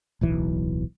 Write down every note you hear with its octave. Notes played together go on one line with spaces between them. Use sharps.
D1 B1 E3